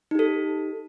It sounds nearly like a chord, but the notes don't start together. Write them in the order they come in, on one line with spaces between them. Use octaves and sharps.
D#4 G4 A4